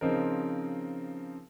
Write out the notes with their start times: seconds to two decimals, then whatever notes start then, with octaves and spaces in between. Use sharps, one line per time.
0.01 C#3 F3 C4 D#4 A#4